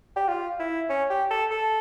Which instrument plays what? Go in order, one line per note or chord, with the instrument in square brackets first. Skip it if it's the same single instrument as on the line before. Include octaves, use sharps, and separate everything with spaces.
[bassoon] G4
F4
E4
C#4
G4
A4
A4